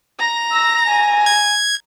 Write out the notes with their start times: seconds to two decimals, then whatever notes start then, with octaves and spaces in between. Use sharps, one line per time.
0.19 A#5 A#6
0.52 E6
0.87 G#5
1.26 G#6